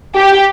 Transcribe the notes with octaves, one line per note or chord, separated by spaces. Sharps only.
G4